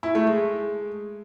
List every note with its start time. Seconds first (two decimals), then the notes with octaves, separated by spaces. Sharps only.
0.03 E4
0.15 A3
0.27 G#3